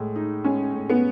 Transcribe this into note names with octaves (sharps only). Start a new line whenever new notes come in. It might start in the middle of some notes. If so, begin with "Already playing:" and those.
Already playing: A2 G#3
D#4
G#3 C#4
A2
B3